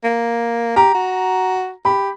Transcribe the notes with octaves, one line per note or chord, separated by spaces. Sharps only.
A#3
G4 A#5
F#4
G4 B5